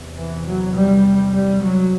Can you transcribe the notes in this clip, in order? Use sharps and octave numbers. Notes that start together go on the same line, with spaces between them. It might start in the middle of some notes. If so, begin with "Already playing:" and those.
Already playing: E2 C3
E3
F#3
G3
G3
F#3